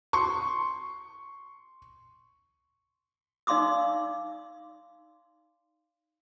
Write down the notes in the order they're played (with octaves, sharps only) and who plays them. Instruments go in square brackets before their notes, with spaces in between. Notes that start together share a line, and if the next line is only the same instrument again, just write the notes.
[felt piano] C6 C#6
[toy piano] D#4 D5 F5 C6 D6 E6